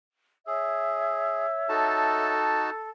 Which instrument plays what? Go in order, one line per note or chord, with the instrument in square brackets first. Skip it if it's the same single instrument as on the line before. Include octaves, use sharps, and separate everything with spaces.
[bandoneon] G#4 [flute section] C#5 E5 E6
[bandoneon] D#4 F#4 A5 [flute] A4